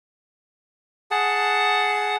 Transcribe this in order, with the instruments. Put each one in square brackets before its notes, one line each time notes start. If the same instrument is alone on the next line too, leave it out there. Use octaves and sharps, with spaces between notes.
[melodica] G#4 F#5 A5